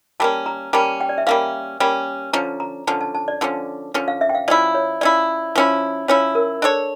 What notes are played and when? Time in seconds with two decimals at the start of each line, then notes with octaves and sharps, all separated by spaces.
0.20 G3 A#3 C#4 A5
0.46 A#5
0.73 G3 A#3 C#4 A5
1.01 G5
1.09 D5
1.18 E5
1.27 G3 A#3 C#4 F5
1.80 G3 A#3 C#4
2.33 D3 F3 C#4 A#5
2.60 A#5
2.87 D3 F3 C#4 A5
3.01 A5
3.15 A5
3.28 D5
3.41 D3 F3 C#4
3.94 D3 F3 C#4
4.08 F5
4.21 E5
4.29 G5
4.35 F5
4.48 F3 C#4 E4 D5
4.75 C#5
5.01 F3 C#4 E4 D5
5.56 F3 C#4 E4
6.08 F3 C#4 E4 C#5
6.35 A#4
6.62 D4 A4 C#5